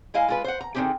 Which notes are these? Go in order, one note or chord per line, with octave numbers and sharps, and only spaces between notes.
G#3 E4 D#5 F5 G#5
G#3 F4 B4
C5 F#5
A#5
D3 D#3 G#3 C4 G4 G#4